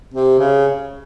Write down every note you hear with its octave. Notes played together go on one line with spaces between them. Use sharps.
C3
C#3